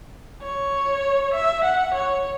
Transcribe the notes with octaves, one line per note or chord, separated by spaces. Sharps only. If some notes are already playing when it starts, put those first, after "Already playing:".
C#5
E5
F#5
C#5